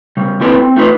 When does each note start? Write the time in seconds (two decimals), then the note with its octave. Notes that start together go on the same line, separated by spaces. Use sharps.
0.17 C#3 G3
0.41 A#3 C4 E4 A4 B4 G5
0.62 C4
0.76 A3 D#4 F4 B4